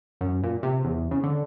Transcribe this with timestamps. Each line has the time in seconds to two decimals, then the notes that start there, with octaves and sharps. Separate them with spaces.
0.21 F#2
0.43 A#2
0.63 C3
0.85 E2
1.11 C#3
1.23 D3